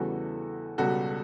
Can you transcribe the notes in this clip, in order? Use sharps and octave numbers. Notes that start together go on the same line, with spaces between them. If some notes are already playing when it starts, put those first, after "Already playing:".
Already playing: E2 C#3 E3 G3 F#4 A4
C#2 B2 G3 F#4 A4